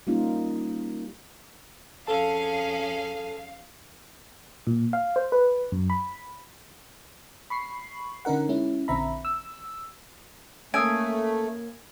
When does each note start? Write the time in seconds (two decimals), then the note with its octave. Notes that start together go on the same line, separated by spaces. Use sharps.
0.07 G3 A#3 C#4 D#4 F4
2.07 F2 C#4 G#4 A4 F5 A5
4.67 A#2
4.93 F5
5.16 C5
5.32 B4
5.72 F#2
5.90 B5
7.50 B5 C#6 C7
8.25 D3 C#4 D#4 A#4 F#5
8.49 G#3 C#4 E4
8.88 A#1 D3 C4 E5 A#5 B5
9.25 E6
10.74 A3 A#3 C#4 G#5 D#6 E6 D7